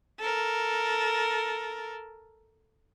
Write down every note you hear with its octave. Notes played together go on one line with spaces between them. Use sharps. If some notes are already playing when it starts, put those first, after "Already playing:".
A4 A#4